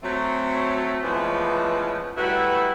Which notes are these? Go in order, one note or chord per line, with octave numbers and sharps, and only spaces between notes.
F#3 A3 C4
E3 F3 G#3 A3 B3 C#4
F#3 G3 A3 E4 F#4 B4